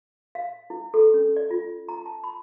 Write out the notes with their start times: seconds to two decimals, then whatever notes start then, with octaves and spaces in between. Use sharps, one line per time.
0.35 F5
0.70 E4
0.94 A4
1.14 C#4
1.36 D5
1.51 F4
1.89 A#5
2.06 A5
2.24 B5